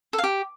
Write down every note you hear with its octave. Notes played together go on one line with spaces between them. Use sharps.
A4
F5
G4